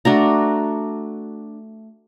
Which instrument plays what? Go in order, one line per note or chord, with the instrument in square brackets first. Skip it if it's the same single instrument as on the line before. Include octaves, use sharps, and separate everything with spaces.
[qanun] A3 D4 F#4 A#5